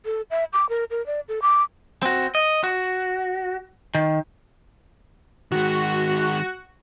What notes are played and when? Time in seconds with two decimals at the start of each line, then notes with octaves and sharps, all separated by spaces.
0.05 A4
0.30 E5
0.53 D6
0.69 A#4
0.90 A#4
1.06 D5
1.28 A4
1.42 D6
2.03 C4 F#4
2.35 D#5
2.64 F#4
3.95 D#3
5.52 D#3 G#3 F#4